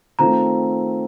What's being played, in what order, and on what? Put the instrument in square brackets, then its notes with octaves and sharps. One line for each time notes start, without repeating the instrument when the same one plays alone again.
[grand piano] D#3 A3 C4 F4 [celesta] A#5